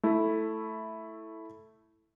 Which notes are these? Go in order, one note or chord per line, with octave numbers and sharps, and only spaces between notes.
A3 E4